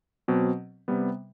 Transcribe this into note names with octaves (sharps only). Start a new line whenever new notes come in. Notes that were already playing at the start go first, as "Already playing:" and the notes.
B2 F#3 C4
C3 G3 B3